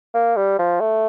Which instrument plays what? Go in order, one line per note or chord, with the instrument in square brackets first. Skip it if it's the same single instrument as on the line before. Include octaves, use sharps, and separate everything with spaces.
[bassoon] A#3
G3
F3
A3